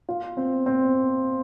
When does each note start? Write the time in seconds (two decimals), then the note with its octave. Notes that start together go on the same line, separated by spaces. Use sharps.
0.09 F4
0.37 C4
0.66 C4